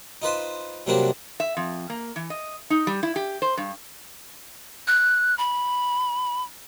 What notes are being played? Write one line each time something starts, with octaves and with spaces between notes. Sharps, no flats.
D#4 F4 B4 C5
C3 F#3 G3 A#3 C4 D4
E5
F2
A#3
E3
D#5
D#4
G3
E4
G4
C5
G2
F#6
B5